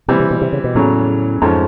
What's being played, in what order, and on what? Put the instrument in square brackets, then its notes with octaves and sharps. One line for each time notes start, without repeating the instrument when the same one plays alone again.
[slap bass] C3 [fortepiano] E3 G3 C4
[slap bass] C3
B2
C3
C#3
B2
[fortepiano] E2 C#3 F#3 A3 [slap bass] A2
[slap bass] F2 [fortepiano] G#2 F3 A3 C#4